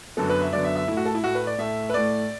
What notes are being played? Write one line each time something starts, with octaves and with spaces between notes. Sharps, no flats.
F#2 D3 F#3 B3 A4
B4
E5
F#2 D3 F#3 B3 D5
E5
E5
A2 A3 E4
F#4
A4
E4
A2 A3 F#4
B4
D5
A2 A3 E5
B4
A2 A3 D5